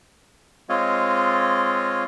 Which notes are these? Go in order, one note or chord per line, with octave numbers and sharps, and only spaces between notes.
G#3 C4 F4 C#5 D#5 F5